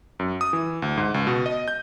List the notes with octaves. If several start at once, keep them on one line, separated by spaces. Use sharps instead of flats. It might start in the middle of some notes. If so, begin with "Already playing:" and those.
F#2
D#6
E3
D2
G#2
C#2
B2
D#5
G6